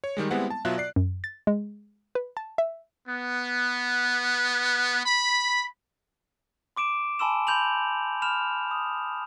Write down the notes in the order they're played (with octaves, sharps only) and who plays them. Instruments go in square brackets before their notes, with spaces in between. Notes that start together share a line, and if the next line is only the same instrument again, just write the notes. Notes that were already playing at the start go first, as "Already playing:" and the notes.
[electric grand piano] C#5
D#3 G3 G#3
G3 G#3 B3 C4 E4 F#5
A5
B2 F#3 F4 E5 F#6
D5 C7
[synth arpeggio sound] F#2
A6
G#3
B4
A5
E5
[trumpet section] B3
B5
[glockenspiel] C6 D6 D7 E7
G#5 A5 B5 C6 E6 E7
B5 C6 G6 F7 F#7
B5 F6 E7 F7
D#6